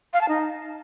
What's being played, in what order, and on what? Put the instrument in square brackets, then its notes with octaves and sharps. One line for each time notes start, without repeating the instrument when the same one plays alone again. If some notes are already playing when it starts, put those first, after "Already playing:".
[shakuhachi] F5
A5
D#4